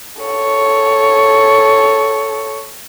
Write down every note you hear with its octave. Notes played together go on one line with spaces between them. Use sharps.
A4 C#5